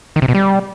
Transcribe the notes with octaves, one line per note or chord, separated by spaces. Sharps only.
D#3
C3
B2
G3